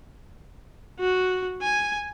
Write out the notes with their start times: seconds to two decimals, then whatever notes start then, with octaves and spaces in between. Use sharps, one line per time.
0.99 F#4
1.62 G#5